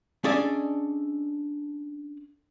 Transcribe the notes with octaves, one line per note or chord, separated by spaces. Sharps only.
C#4 D4 G#4 A4 D5 D#5